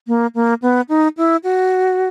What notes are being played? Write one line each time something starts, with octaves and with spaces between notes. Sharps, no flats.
A#3
A#3
B3
D#4
E4
F#4